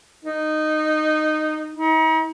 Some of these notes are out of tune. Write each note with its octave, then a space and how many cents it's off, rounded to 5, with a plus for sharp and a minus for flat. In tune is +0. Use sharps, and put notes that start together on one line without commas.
D#4 -15
D#4 +40